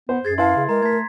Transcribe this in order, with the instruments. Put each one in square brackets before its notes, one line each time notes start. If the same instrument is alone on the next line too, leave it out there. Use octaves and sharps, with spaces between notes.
[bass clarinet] B3 [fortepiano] C5
[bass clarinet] F#2 [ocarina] G#4 [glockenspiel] G#6 A6 C7
[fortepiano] E4 B4 A5 [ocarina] F5 [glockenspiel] C6 A6
[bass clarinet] C#3
[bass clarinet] G#3 [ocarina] A#4 [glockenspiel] A#5
[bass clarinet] A3 [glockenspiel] G#6 B6